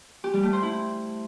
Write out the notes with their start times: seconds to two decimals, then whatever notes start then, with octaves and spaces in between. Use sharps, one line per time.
0.24 G4
0.33 G3
0.43 A3
0.53 C5
0.62 E4